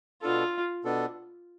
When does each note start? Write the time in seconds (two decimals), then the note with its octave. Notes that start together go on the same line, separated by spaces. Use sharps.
0.22 B2 B3 D4 F4 A4
0.84 B2 B3 D4 A4